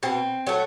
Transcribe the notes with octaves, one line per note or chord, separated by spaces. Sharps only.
B2 C4
F#3 A3